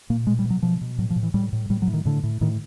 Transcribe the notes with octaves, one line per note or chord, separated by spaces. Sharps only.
A#2 A#3
B2 G#3
G3
B2
F#3
B2 F3
B2
A2 F#3
F3
A2
E3
A2 G3
A2
A2 G3
F#3
A2
D#3
A2 D3
A2
A2 D#3